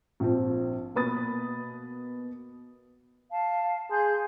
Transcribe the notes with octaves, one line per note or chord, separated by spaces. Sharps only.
A#1 F3 C4
B2 A#3 B4 B5 D#6 A6
F5 A5
G#4 C6 G6